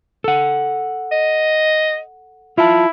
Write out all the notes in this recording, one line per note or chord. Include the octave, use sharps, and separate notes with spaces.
A4 F#5
D#5
E4 F4 A5